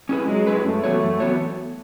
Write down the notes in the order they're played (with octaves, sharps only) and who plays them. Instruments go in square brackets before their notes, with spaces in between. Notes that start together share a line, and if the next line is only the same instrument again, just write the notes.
[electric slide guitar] C#4 E4 G#4 B4
[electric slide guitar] F#3 [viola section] G#3
[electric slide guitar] C#4 E4 G#4 B4
[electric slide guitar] F#2 [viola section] A3
[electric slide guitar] E3 B3 F#4 C#5
F#2
E3 B3 F#4 C#5